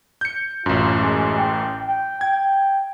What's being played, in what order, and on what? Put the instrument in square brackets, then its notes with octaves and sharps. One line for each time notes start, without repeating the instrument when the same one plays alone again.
[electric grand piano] G6 C#7
[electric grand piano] A1 F#2 [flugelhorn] F4
[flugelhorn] G#3
G5
G5
[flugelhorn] G5 [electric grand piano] G#6